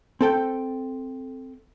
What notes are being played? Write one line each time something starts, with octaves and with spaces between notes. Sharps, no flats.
C4 A4 G5